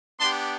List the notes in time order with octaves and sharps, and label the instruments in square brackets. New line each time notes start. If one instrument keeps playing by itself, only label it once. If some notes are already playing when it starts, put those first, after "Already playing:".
[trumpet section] B3 D4 G4 A5 C6